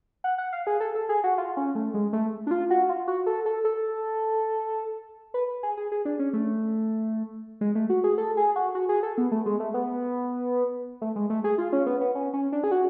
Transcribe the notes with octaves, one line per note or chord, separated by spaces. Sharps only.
F#5
F#5
F5
G#4
A4
A4
G#4
F#4
F4
C#4
A3
G#3
A3
D4
F4
F#4
F4
F#4
A4
A4
A4
B4
G#4
G#4
G#4
D4
C#4
A3
G#3
A3
F#4
G#4
A4
G#4
F#4
F#4
G#4
A4
B3
A3
G#3
A3
B3
A3
G#3
A3
G#4
F4
C#4
B3
B3
C#4
C#4
D4
G#4
F#4